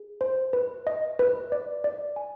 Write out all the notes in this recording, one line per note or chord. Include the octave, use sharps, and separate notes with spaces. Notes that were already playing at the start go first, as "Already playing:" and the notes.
Already playing: G#4
C5
B4
D#5
B4
D5
D5
G#5